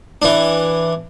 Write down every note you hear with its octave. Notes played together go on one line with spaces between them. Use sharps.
E3 D4